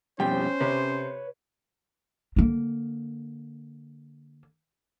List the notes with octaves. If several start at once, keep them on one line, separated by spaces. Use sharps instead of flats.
F2 B2 G3 C#4 C5 G5
C3 B4 C#5
D3 A#3